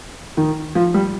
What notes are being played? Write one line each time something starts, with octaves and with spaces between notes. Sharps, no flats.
D#3
F3
G3